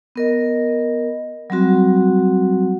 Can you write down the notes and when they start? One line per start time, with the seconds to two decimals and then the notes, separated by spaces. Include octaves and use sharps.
0.16 B3 A#4 D#5
1.50 F#3 G3 C4 F#4